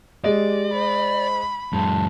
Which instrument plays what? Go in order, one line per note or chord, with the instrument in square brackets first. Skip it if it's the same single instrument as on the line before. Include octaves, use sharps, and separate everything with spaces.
[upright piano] G#3 D#5 [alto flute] G4 [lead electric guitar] D5
[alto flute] C5 [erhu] B5
[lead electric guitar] F#2 G#3 [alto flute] A5